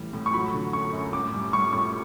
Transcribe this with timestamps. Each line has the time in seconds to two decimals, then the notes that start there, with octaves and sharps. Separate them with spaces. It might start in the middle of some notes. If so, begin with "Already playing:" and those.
Already playing: A2 E3 G3
0.13 A2
0.26 C#6
0.33 F#3 B5
0.54 D3
0.73 F#2 C#6
0.93 F#2
1.13 A2 D6
1.33 G3
1.53 G3 C#6
1.73 A2 C#6